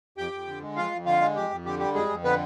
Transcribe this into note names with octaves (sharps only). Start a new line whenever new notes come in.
F2 G4 G5
F2
D3
G#3
F2 F4 F5
F2
D3 F4 F5
G#3
F2 G4
F2
D3 G4
G3 G4
F2 G#3 G#4
F2
D3 B3 B4